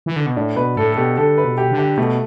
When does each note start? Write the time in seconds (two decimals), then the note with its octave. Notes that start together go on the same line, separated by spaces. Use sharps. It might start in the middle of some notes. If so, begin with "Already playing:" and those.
0.06 E3
0.16 D3
0.26 B2
0.36 A2 D4
0.56 B2 B4
0.77 A2 A4
0.92 A4
0.97 B2 G4
1.17 D3 A4
1.38 B4
1.44 B2
1.58 G4
1.71 D3
1.78 G4
1.98 B2 A3